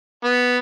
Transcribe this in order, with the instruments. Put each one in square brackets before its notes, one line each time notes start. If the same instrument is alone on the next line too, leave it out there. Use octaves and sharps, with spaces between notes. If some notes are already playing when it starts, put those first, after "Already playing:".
[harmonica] B3